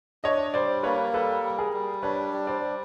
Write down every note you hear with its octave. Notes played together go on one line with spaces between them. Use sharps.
D4 C#5 D#5
G3 C5 D5
A#3 B4 C#5
G3 A4 B4
G3
G#4 A#4
G3
D4 B4 C#5
G3
C5 D5
G3